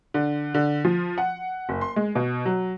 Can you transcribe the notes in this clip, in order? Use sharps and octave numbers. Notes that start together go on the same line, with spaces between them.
D3
D3
F3
F#5
F#1
C6
G#3
B2
F#3